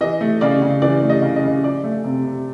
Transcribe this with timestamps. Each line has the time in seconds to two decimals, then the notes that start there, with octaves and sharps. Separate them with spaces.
0.01 E3 D#5
0.21 A3
0.41 C#3 D5
0.62 C#3
0.82 E3 D5
1.02 A3
1.10 D#5
1.22 C#3
1.36 D#5
1.44 C#3
1.64 F3 D5
1.84 A3
2.04 C3
2.25 C3